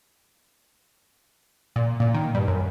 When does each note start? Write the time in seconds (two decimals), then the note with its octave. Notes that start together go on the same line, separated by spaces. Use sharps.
1.76 A#2
2.00 A#2
2.14 D#3
2.35 G2
2.48 F#2